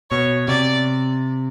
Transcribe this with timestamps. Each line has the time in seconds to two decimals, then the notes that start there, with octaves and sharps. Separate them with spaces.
0.10 B2 C#5
0.48 C3 D5